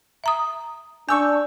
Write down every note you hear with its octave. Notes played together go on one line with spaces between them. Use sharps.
E5 A#5 D#6
D4 G#5 C#6 E6 G6